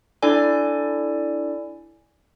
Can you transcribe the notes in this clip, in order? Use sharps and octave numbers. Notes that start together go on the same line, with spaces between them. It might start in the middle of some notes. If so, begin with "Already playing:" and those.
D4 E4 A4 D5 G#5